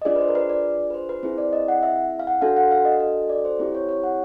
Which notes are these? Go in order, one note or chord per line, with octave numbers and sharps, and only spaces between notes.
D#5
D4 F4 G#4 D5
B4
C5
A#4
B4
D5
B4
C5
B4
C4 E4 G#4 C5
D5
D#5
F#5
E5
F5
F#5
D4 F#4 A4 F5
F#5
F5
D#5
D#5
D5
C5
C4 E4 G4 C5
C#5
C#5
F#5